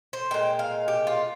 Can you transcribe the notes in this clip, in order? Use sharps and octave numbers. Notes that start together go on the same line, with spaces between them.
C5
A#2 G#3 G5
F5
G4
F4